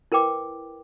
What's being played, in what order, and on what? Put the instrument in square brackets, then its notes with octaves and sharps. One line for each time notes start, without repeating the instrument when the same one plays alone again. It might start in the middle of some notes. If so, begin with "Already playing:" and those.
[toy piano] E4 A#4 B4 G5 D6